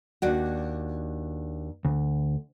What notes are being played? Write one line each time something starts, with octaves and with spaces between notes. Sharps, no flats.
D#2 D4 F#4
D2